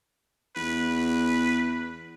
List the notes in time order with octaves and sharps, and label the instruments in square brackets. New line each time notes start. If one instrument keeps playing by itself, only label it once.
[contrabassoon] E2 [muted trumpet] B4